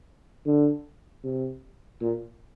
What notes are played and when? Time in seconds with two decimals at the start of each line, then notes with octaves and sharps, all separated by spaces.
0.46 D3
1.24 C3
2.01 A#2